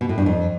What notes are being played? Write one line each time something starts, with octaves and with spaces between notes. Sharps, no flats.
B2
A2
G2
F2